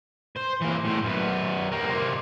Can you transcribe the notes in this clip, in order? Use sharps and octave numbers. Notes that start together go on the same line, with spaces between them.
C5
E3 A#3
A2 C5
F#2 B3
A#3 G4
C3 A#3